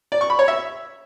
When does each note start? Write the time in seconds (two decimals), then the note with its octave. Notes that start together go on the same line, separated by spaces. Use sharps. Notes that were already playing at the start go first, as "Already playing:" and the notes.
0.12 D5
0.21 C#6
0.30 B5
0.39 C#5
0.48 E5